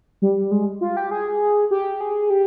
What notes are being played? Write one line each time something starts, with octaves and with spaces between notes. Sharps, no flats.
G3
G#3
F4
G4
G#4
G4
G#4
G4